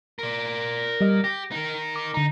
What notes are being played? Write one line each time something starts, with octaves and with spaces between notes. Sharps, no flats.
A#4 D5
G3 D#5 F6
G4 A#6
D#4 A#4
D6
D3 D#4 A#5